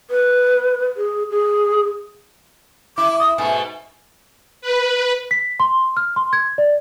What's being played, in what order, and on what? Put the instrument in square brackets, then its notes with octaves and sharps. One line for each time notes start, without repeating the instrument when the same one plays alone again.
[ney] B4
G#4
G#4
[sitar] E4 [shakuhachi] D6
[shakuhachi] D#6
[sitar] G#2 B2 A3 [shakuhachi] G#5
[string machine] B4
[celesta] B6
C6
F6
C6
G#6
D5